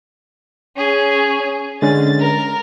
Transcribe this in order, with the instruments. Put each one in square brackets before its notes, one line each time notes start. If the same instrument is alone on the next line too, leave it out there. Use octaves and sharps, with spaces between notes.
[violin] C#4 G#4
[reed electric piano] D3 G#3 C#4 [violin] A6
[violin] A#4